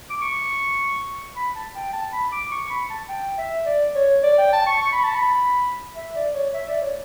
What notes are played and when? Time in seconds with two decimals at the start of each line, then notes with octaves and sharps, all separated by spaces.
0.10 D6
0.21 C#6
1.37 B5
1.55 A5
1.75 G5
1.93 A5
2.13 B5
2.32 D6
2.52 C#6
2.70 B5
2.90 A5
3.09 G5
3.38 E5
3.66 D5
3.95 C#5
4.23 D5
4.38 G5
4.53 A5
4.67 C#6
4.82 C#6
4.92 B5
5.03 A5
5.15 B5
5.96 E5
6.15 D5
6.34 C#5
6.54 E5
6.68 D5
6.82 C#5